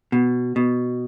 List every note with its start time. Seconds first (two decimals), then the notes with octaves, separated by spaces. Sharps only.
0.12 B2
0.56 B2